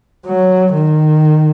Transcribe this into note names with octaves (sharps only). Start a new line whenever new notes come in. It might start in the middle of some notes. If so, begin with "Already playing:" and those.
F#3
D#3